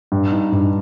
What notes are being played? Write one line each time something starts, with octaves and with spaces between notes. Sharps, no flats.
G2
D#4
G2